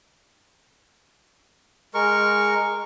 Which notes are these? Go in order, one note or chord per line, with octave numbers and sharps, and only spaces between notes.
G#3 A#4 C#6